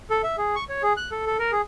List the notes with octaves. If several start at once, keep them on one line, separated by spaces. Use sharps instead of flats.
A4
E5
G#4
C#6
C#5
G#4
F#6
A4
A4
A#4
G#4